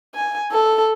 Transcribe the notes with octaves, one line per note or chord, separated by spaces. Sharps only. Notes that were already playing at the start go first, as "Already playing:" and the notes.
G#5
A4